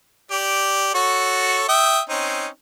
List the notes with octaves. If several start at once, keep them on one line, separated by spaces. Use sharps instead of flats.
G4 D5
F#4 A4 C#5
E5 G5 D#6
C4 C#4 D#4